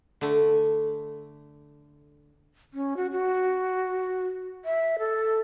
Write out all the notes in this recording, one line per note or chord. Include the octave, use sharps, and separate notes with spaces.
D3 A3
C#4
F#4
F#4
E5
A4